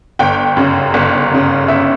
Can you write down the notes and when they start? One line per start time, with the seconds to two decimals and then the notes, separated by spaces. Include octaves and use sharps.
0.19 G1 G5
0.57 F#2 C#3
0.94 G1
1.31 F#2 C#3
1.68 G1 E5